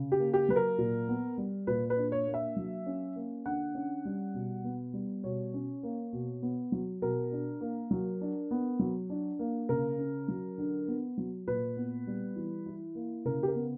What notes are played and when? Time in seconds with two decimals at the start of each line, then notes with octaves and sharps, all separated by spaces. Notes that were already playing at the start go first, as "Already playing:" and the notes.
Already playing: C#3
0.12 G4
0.19 A#3
0.33 G4
0.49 F#3 B4
0.56 A#4
0.78 A#2
1.08 B3
1.38 G3
1.67 A#2 B4
1.90 B4
1.97 D4
2.12 C#5
2.27 A#3
2.34 E5
2.56 F#3
2.86 C#4
3.16 A#3
3.46 D3 F#5
3.75 C#4
4.05 G3
4.34 B2
4.64 B3
4.93 G3
5.24 B2 C#5
5.54 C#4
5.83 A#3
6.13 B2
6.42 B3
6.72 F#3
7.02 B2 A#4
7.31 D4
7.61 A#3
7.91 F#3
8.21 D4
8.51 B3
8.79 F#3
9.10 D4
9.39 A#3
9.69 C#3 A#4
9.98 C#4
10.28 F#3
10.58 D3
10.88 B3
11.18 F#3
11.47 A#2 B4
11.76 B3
12.07 G3
12.36 E3
12.66 E4
12.95 A#3
13.25 C#3 A#4
13.43 G4
13.48 A#4
13.55 B3